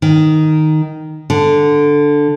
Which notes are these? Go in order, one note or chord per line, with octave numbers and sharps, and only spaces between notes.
D#3
D3